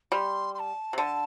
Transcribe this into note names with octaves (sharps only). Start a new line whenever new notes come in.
G3 C6
C6
A5
C3
D3 A5